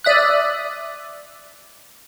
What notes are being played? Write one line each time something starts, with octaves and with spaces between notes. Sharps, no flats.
D5 E5 D#6 F#6